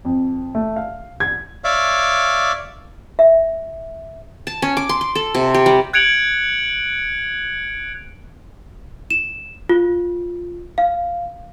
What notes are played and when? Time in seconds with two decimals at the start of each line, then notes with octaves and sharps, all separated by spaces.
0.05 F2
0.55 A3
0.76 F5
1.20 G#6
1.64 C#5 D5 E5 F5 D6
3.19 E5
4.47 A5
4.62 C#4
4.77 D6
4.89 C6
5.01 C6
5.15 A4
5.35 C3
5.54 G4
5.66 G3
5.93 F#6 G#6 C#7 D7 F7 F#7
9.11 E7
9.69 F4
10.78 F5